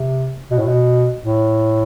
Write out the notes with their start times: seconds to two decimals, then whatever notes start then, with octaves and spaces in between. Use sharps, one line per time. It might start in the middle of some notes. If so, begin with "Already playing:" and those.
Already playing: C3
0.50 B2
0.59 A2
0.68 B2
1.22 A2